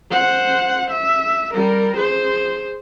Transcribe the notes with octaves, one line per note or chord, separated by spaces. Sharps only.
C5 F#5
E5
G3 A#4
G#4 C5